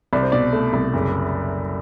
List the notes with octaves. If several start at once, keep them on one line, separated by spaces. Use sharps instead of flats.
C2 D5
C5
B2 D5
A3
C2
F#1